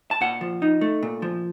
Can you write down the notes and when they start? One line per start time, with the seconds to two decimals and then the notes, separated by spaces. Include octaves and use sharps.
0.11 A5
0.21 A#2 F#5
0.41 F3
0.62 D#4
0.81 A3
1.03 A#2
1.22 F3